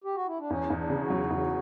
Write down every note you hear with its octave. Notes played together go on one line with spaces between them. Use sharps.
G4
F#4
E4
D4
E2 C#4
E2
D4
C#3
F#4
F#3
E2